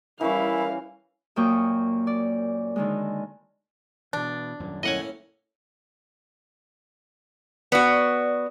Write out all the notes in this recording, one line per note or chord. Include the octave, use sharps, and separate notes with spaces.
E3 G3 C#4 E4 A#4 C#5 F5
F#2 A#2 A#3 G5 C#6 D#6
D5
D3 D#3 G#3
B2 E3 D4
D#1 F#2 A#2
A2 A#3 C#4 D#5 F#5 G#5
B3 F#4 D5